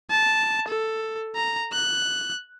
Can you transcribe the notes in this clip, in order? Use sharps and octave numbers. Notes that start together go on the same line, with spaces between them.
A5
A4
A#5
F#6